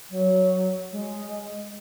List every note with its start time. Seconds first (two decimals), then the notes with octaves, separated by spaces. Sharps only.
0.09 F#3
0.91 G#3